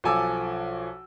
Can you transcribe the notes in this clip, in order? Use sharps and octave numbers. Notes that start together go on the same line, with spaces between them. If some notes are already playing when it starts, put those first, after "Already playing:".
B1 F3 A4 G#5 D6 E6